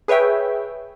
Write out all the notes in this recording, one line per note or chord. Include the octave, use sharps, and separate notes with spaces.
G#4 B4 C#5 E5 G5